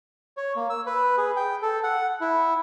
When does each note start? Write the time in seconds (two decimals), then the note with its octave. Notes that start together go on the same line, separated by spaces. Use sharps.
0.37 C#5
0.56 A#3
0.70 E6
0.87 B4
1.18 G#4
1.36 G5
1.62 A4
1.84 F#5
2.21 E4